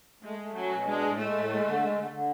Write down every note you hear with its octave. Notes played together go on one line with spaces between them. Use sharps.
G#3 A3
A3
F#3 C#4
B2
G#3 D4
A2
G#3 A3
A2
G#3
D3
G#3
D3
D3